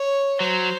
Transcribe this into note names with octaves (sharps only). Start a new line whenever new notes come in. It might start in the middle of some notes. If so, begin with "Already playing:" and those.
Already playing: C#5
F#3 C5